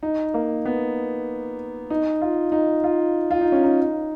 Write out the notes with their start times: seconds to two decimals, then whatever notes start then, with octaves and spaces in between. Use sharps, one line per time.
0.03 D#4
0.34 A#3
0.65 B3
1.90 D#4
2.22 F4
2.52 D#4
2.84 F4
3.31 F4
3.41 D#4
3.52 C#4
3.64 D#4